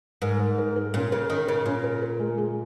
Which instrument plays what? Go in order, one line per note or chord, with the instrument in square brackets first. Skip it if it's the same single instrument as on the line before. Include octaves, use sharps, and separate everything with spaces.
[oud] G#2 [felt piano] A#4
[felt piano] A#4
A#4
A#4
[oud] A#2 [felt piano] C#4
[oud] C#3 [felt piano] A#4
[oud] D#3 [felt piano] C#4
[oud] C#3 [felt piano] A#4
[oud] A#2 [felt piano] C#4
[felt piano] A#4
A#4
G#3
G#3